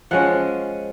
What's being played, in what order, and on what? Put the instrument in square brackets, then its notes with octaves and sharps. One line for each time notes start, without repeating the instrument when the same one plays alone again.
[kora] F3 G#3 C#4 F#5